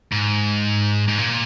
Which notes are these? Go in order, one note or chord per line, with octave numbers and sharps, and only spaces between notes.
G#2
G#2
A#2